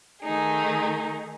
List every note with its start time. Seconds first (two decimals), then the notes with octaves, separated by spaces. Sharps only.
0.22 D#3 A3 D#4 G#4